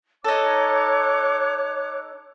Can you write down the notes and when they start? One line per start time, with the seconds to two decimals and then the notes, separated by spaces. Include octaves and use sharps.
0.24 D#4 A4 C#5 D6 F#6